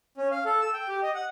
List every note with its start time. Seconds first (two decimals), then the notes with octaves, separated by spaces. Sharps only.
0.18 C#4
0.31 F5
0.45 A4
0.61 E6
0.74 G5
0.89 G4
1.03 D#5
1.14 F#5